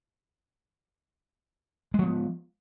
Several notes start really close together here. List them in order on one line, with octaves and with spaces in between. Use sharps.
G#3 F3 B3